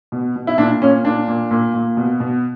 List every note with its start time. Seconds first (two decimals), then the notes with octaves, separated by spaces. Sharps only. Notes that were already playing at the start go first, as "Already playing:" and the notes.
0.12 B2
0.36 B2
0.47 E4
0.58 A#2 D4
0.82 A#2 C#4
1.05 A#2 D4
1.28 A#2
1.51 A#2
1.74 A#2
1.97 B2
2.20 B2